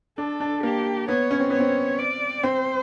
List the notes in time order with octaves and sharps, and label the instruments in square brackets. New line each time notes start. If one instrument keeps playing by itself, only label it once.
[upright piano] D4 [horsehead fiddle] A4
[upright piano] D4
[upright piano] A#3 [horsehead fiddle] G4
[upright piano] B3 [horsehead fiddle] C#5
[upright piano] C#4
C4
[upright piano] B3 [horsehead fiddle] C#5
[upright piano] C4
[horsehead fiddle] D5
[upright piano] C4 [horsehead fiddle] C5